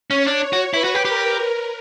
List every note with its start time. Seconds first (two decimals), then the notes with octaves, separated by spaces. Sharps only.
0.11 C#4 C#5
0.26 D4
0.42 C#5
0.53 F#4
0.73 E4 B4
0.84 F#4
0.95 G4
1.05 G4 A#4